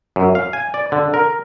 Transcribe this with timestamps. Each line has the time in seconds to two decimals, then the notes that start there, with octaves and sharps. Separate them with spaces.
0.16 F#2
0.35 F5
0.53 G#5
0.74 D5
0.92 D3
1.14 A#4